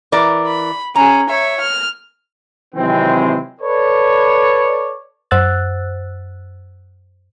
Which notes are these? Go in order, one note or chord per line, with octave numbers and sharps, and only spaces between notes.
E3 A#4 D5
B5
C#4 G#4 A#5
C#5 E5
F6
C3 D#3 E3 F#3 G#3 C4
A4 B4 C#5 D5
F#2 C5 F#5 E6 F#6 A6